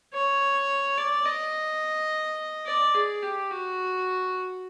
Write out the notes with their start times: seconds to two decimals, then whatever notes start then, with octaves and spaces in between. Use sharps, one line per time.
0.14 C#5
0.98 D5
1.25 D#5
2.66 D5
2.94 G#4
3.22 G4
3.50 F#4